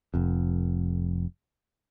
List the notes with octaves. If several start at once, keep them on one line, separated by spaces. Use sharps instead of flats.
F1 F2